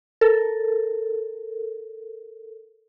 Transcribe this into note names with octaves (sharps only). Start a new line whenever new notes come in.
A4 A#4